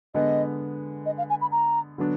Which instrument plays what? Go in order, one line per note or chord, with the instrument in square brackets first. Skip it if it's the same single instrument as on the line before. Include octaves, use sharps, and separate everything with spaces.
[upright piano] D3 G#3 B3 [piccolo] D#5
[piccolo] D#5
F5
G#5
B5
A#5
[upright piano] D3 F#3 B3 D4